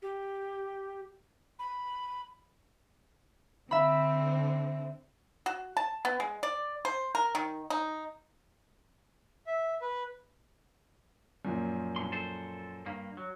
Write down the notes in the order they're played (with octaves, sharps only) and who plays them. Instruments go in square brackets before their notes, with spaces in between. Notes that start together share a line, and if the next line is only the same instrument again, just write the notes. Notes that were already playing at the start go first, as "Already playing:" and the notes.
[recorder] G4
B5
[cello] D3 C4 [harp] E5 B5
[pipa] F#4
A5
B3
G#3
D5
C5
A#4
D#3
D#4
[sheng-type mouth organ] E5
B4
[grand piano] F#2 A#2 F3
[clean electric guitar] G2 B2 C6
A4 C5
G2 A#3
F#3